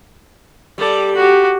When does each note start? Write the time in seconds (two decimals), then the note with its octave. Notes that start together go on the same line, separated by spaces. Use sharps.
0.78 G3 A4 D5
1.15 F#4 G4